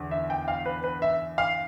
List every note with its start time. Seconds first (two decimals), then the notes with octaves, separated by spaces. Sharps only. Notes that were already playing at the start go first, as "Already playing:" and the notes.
Already playing: E2 D3
0.11 E5
0.30 G5
0.48 F5
0.66 B4
0.84 B4
1.02 E5
1.38 F5